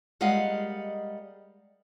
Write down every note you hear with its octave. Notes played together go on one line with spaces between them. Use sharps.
G3 G#3 A#3 D#5 F5 F#5